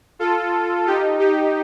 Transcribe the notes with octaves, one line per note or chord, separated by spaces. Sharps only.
F4 A4
D#4 G4
D#4 G4